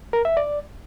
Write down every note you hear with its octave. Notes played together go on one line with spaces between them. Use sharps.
A#4
E5
D5